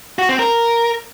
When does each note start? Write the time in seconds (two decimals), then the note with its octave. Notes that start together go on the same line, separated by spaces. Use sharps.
0.19 F#4
0.29 C4
0.39 A#4